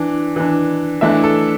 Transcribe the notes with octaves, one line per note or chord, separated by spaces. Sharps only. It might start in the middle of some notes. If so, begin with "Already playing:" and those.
Already playing: E3 D4
E3 D4
E3 A3 D4 E5
A4